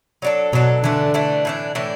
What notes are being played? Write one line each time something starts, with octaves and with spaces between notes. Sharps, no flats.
F#3 D4 A4
B2 F#3 D4 A4
D3 E3 A3 D4
E3 A3 D4
A2 E3 D4
A2 E3 D4